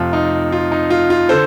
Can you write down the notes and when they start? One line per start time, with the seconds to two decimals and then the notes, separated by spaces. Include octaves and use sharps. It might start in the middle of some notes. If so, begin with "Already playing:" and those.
Already playing: F2 C3 F3 A3 F4
0.13 D#4
0.52 F4
0.72 D#4
0.90 F4
1.10 F4
1.29 D3 A4 C5